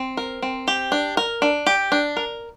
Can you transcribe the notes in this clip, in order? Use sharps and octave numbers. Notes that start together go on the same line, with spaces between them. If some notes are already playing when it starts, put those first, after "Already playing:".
Already playing: C4
A#4
C4
G4
D4
A#4
D4
G4
D4
A#4